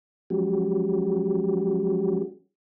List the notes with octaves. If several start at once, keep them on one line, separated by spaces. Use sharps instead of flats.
F3 F#3 G#3 C#4 F#4 G4